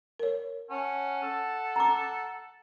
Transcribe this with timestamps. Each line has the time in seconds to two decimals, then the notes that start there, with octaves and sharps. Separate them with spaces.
0.20 A#4 C#5
0.70 C#4 F#5 A5
1.23 A4
1.76 A#5 D6